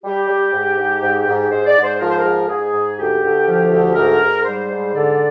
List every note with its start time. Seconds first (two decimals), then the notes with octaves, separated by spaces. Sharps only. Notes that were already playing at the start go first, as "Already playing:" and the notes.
0.03 G3 G4
0.28 G3
0.52 G#2
0.76 G#2
1.01 G#2
1.26 G#2
1.50 G#2 C5
1.66 D5
1.76 G#2
1.83 C5
1.99 F3 A#4
2.08 C5
2.17 A#4
2.23 G#2
2.48 G#2 G#4
2.73 G#2
2.97 D2 G4
3.22 D2
3.47 F3
3.72 D2
3.95 G#2 A#4
4.21 G#2
4.44 G3 C5
4.69 G#2
4.95 D3 D5